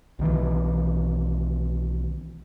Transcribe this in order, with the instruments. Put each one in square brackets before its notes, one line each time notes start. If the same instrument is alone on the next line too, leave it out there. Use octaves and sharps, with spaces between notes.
[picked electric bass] B1 D#3 E3